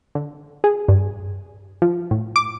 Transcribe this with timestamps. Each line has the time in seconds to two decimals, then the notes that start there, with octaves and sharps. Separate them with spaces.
0.15 D3
0.64 G#4
0.88 G2
1.82 F3
2.11 A2
2.36 D6